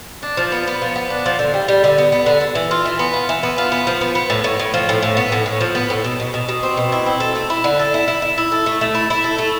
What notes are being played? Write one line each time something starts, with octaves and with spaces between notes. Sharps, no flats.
D4
F3
B3
B3
F3
B3
D4
F3
D3
G3
G3
D3
B3
B3
D3
D3
E3
F4
E3
B3
F4
E3
B3
F4
B3
F3
B3
B3
A2
A2
A2
F3
A2
A2
B3
A2
A2
F3
B3
A2
B2
B2
B2
B2
C4
B2
E4
C4
A4
A3
E4
D3
A4
E4
E4
E4
E4
A4
A3
A3
E4
E4
A4
A3